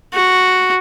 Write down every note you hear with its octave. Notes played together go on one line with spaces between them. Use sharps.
F#4